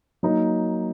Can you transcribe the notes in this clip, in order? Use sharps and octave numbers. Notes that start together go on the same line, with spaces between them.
F#3 A#3 D#4